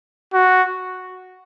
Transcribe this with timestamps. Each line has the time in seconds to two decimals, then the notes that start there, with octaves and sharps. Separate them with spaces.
0.34 F#4